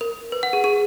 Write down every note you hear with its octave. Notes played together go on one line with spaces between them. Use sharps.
A#4
B4
F#5
G#4
G#4